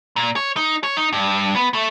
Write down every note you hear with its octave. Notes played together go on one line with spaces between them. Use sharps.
A#2
C#5
D#4
C#5
D#4
G2
B3
A3